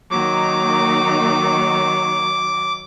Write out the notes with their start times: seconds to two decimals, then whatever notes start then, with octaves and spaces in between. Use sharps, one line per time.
0.11 D#3 F#3 A#3 D#4 D6